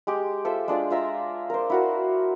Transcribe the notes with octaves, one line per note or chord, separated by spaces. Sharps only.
G#3 G4
F4 A4 C5 E5
G#3 D4 F4 D5
F4 E5 A#5 E6
A#4 C5
E4 F#4 A#4